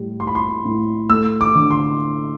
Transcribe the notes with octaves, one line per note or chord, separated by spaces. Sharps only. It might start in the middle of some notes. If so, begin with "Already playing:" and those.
Already playing: A2 G3
A2 C6
B5
C6
A2
A3 E6
D6
D3
C6